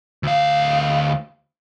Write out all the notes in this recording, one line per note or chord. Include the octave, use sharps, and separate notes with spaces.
D2 F5